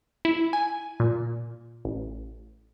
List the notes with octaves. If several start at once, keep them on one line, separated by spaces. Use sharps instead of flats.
E4
G#5
A#2
A1